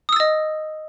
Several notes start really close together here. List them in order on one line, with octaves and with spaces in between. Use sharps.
D#6 E6 A6 D#5